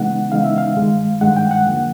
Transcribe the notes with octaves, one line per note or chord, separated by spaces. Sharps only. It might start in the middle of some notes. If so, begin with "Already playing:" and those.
Already playing: C#3 E3 G#3 B3 D#4 F#5
C#3 E3 G#3 B3 D#4 F5
E5
F5
G2 D#3 G#3
G2 D#3 G#3 F#5
G5
F#5
F2 D3 F3 A#3